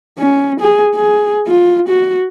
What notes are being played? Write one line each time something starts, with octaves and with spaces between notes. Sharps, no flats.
C#4
G#4
G#4
F4
F#4